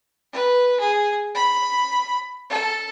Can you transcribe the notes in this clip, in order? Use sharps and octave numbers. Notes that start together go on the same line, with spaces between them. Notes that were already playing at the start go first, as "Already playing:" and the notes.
B4
G#4
B5
A4